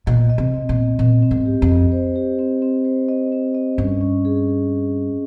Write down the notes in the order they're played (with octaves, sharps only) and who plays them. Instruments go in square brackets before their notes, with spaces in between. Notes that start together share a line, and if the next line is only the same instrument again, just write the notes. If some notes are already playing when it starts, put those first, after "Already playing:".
[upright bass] A#2 [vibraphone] D#5
[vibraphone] D#5
[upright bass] C3
[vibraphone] C4
[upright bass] A#2
[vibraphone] D#5
[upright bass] A#2 [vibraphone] C4
[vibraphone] C4
[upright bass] G#2
[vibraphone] G4
[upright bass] F2
[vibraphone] D#5
C5
G4
C4
C4
C5
D#5
C4
D#5
[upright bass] G2 [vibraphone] C#4
[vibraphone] C#4
G#4